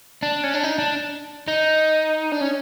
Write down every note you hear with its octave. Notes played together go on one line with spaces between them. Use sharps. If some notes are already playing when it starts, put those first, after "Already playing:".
D4
C#4
D4
D#4
D4
D#4
D4
C#4